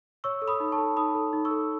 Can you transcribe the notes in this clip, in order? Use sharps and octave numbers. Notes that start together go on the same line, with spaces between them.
C#5 C#6 E6
A4
B5 D#6
D#4
A5 C#6
A4
D#4 B5 D#6
A4
D#4
C#6 E6
A4